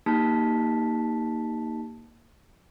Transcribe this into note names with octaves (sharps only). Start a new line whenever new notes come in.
A#3 D#4 G4 A5 B6